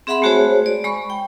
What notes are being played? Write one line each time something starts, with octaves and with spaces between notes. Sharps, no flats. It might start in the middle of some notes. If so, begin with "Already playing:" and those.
C4 G#4 E5 F#5 B5 C6
G#3 A3 F#4 G#4 C5 C#5
D5
G#3 B5 C#6
G5